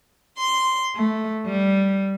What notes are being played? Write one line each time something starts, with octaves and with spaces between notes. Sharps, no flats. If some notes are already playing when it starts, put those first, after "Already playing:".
C6
A3
G3